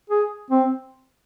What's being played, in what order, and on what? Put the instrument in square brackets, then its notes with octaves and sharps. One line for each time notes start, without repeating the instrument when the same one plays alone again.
[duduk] G#4
C4